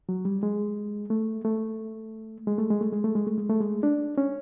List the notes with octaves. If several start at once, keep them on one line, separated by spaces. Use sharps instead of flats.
F#3
G3
G#3
A3
A3
G#3
A3
G#3
A3
G#3
A3
G#3
A3
G#3
A3
G#3
D4
C#4